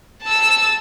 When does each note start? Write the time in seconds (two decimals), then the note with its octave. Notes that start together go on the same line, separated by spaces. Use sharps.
0.23 A5 E6